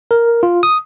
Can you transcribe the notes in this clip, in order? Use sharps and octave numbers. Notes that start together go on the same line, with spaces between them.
A#4
F4
D#6